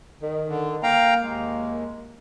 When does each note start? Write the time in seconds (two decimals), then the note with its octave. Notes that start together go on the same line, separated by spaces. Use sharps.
0.22 D#3
0.48 D3
0.83 A#3 F5 G5 A#5
1.22 D#2 G#3